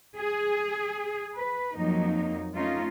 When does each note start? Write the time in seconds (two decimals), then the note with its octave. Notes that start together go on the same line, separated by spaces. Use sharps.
0.17 G#4
1.36 B4
1.77 F2 F#3 A#3 D#4
2.56 A3 C#4 D#4 F4